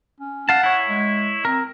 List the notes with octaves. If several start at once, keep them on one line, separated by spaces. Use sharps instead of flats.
C#4
F5 F#5 A5
E4 C#5
G#3
C4 A#4